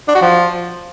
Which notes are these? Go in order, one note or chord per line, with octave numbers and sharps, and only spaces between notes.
D4
F#4
F3